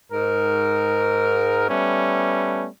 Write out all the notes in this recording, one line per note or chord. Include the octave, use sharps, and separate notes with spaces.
G#2 A#4
G3 A3 B3 C#4